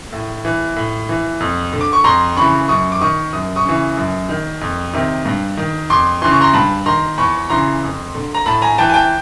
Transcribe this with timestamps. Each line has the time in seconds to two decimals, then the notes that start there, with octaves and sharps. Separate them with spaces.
0.13 A2
0.45 E3
0.76 A2
1.09 E3
1.40 F2
1.73 D3
1.81 D6
1.93 C#6
2.04 F2 A#5 C6
2.36 C#3 E3 B5 C#6
2.68 F#2 C#6 D#6
2.92 D6
3.01 D#3 C#6 D#6
3.33 F#2 D#6
3.56 C#6 D#6
3.65 C#3 E3
3.97 F#2
4.29 D#3
4.61 F2
4.94 C3 D#3
5.25 G2
5.57 D#3
5.90 F2 C6 D6
6.22 C#3 E3 C6
6.31 C#6
6.41 A#5 C6
6.53 G2 A5 B5
6.86 D#3 A#5 C6
7.18 E2 B5 C#6
7.50 C#3 E3 A#5 C6
7.83 F2
8.15 D3
8.35 A#5
8.46 A2 A5 B5
8.62 G#5 A#5
8.78 E3 G5 A5
8.90 G#5
8.94 G5 A5